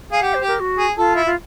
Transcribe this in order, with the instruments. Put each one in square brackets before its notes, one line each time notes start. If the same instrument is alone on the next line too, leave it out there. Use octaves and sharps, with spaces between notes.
[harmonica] G#4 [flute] F5
[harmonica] G4 [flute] F#5
[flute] C5
[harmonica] G4
[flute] A#4
F#4
[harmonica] G#4
[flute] F4 [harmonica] A4
[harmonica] E4
[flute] F4